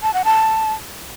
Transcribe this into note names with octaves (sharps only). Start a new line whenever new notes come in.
A5
F#5
A5